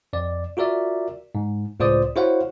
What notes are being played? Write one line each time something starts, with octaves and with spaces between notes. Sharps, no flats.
F2 D5
F4 F#4 A#4 D5 E5
G#2
C#2 A2 F4 C5 D5 D#6
E4 F#4 C5 C#5 F5 F#5